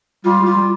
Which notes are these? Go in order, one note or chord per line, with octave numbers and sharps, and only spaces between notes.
G3 F4
G3
F4
G3